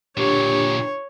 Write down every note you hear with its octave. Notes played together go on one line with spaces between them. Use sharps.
A#2 D3 D4 G4 C#5